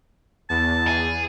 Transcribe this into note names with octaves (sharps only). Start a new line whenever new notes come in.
E2 A5
G#4